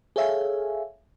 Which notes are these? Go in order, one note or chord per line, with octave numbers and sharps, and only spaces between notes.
G#4 A4 C#5 E5 F5 G#5